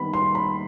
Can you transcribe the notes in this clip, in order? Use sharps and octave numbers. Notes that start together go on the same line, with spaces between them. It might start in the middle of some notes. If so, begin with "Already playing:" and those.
Already playing: D#3 G3 B3 B5
C6
B5